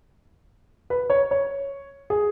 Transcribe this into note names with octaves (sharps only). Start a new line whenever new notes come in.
B4
C#5
C#5
G#4